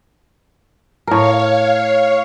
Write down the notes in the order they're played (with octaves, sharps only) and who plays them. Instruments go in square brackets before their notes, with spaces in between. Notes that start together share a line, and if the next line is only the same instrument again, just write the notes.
[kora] A2 A#4 [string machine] C#5 F5